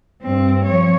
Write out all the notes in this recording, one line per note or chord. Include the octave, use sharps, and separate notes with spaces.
G2 C4
F3 C#5